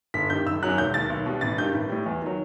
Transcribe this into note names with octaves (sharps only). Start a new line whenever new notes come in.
G1 B6
G2 D#3 G3 G6
F#1 E6
F#2 D#3 F#3 F#6
E1 G6
D#2 D#3 A6
B1
B2 G3
A1 A6
G2 D#3 G3 G6
A1
A2 G3
E2
D#3 F#3